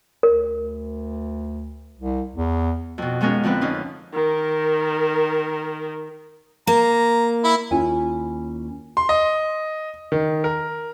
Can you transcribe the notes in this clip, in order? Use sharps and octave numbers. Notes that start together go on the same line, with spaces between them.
D2 A#4
C2
E2
F2 B2
F3 G#3 B3 C#4 A#4
D3 F3 C4 B4
D3 C#4 D#4 F4
D#3 A#4
A#3 A#5
E4
D#2 C#4 E4 F4 C#5 G#5
C6
D#5
D#3
A#4